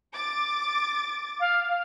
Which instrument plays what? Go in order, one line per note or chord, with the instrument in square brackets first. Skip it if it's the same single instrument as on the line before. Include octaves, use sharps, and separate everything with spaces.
[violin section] D6 A6
[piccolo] F5